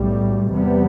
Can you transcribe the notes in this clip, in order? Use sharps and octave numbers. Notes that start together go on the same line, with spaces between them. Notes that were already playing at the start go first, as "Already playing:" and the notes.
Already playing: B1 A2 G3
E2 C3 G3 B3